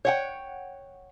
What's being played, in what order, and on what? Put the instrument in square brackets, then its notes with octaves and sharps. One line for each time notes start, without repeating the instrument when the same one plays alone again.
[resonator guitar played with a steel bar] C#5 F#5 G5